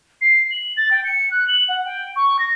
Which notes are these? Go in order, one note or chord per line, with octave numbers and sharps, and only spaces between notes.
C7
F#7
A6
G5
C#7
F#6
F#7
F#5
G5
C#6
A#6